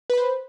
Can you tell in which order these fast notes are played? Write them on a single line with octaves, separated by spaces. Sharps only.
B4 B5 C5